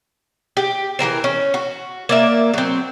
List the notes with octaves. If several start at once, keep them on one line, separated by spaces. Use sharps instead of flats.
G4
E3 G3 A#4 C5
C#4
F#4
A#3 D5 E5
F#3 C4